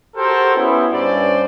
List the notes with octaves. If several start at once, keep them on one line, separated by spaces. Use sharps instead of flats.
F#4 G4 A4 A#4 C5
B3 C#4 E4
G2 C#4 C5 D5